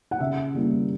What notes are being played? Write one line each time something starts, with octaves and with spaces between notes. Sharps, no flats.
F#5
C#3 E5
G3 A#3 E4